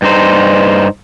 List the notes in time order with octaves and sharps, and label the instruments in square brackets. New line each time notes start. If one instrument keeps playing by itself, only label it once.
[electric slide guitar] G2 D#4 C5